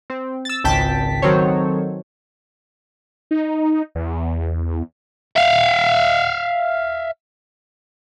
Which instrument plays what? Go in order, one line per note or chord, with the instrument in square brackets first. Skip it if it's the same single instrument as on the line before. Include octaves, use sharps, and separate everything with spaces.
[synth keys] C4
E6 A6
G#1 C#2 G5 A5 B6
D#3 F#3 C4 A4 C5 C#5
[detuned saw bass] D#4
E2
[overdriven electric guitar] E5 F5